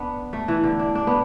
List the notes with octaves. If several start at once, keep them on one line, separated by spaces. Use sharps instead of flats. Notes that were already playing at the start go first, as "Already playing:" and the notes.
Already playing: B3 D4
A3
E3
D3
D4
D4
B3